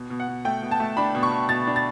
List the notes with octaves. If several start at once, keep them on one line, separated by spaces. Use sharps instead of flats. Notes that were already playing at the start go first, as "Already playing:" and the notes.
Already playing: B2
B2
F#5
B2
A3 G5
B2
A5
A3
D4 B5
B2
C#6
B2
B2 A6
D4
A6